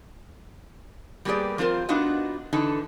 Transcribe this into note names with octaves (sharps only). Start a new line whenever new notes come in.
G3 A#3 B3 G4 G#4 D5
F3 C4 F4 A#4 C5
B3 D4 D#4 F4 F#4 D#5
D3 E3 D#4 A4